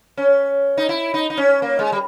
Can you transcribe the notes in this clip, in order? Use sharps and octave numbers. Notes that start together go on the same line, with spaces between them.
C#4
D#4
E4
D#4
D#4
C#4
A#3
G#3
G3